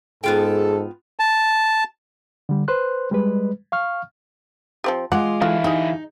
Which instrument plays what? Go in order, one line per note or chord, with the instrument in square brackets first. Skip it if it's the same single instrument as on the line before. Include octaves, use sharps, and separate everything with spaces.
[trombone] G#2 [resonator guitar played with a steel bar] B3 F4 G5 [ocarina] G#4 [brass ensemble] A4
[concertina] A5
[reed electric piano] D3 G3
B4 C5 C6 F#6
G3 G#3 B4
F5 C#6 F6
[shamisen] F3 C4 G4
[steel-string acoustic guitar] G#3 F4 [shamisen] F#5 [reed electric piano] D6
[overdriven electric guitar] D3 E4 [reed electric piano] E3 F5 [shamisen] A3 F#4
[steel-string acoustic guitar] D#4 [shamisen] G4 G#4